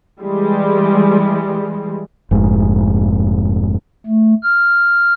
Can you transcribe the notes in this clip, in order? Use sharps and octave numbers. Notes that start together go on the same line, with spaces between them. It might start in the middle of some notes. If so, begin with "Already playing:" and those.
E3 G3 G#3
F1 G#2
A3
F6